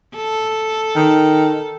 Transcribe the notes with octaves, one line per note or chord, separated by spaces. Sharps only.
A4
D#3